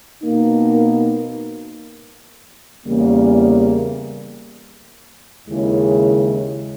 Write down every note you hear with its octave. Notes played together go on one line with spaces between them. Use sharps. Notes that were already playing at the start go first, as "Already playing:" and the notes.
B2 A#3 D#4
E2 C#3 G3 A#3
D#2 C#3 G#3 C#4 E4